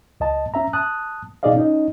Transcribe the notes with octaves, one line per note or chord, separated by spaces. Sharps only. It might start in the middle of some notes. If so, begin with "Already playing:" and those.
C#2 D#5 A5
C#4 E5 A#5
A5 D#6 F#6
B2 D#4 G#4 D5 D#5 F5
C#4 D#4 D#5